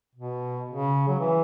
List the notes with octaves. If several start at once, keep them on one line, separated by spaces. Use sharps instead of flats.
B2
C#3
F#3
E3